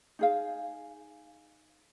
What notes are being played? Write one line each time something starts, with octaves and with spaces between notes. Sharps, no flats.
D#4 G#4 F5